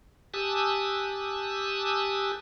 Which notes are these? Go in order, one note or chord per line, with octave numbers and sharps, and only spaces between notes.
G4 G#5 A5 D#6 E6 F#6